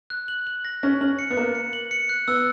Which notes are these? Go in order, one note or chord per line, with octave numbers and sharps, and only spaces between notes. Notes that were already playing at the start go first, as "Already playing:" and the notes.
F#6
F#7
F#7
A#6
C#4 A#6
C#4 F#7
C#7
B3
A#3 C#7
C#7
F#7
C#7
F#6
B3 E6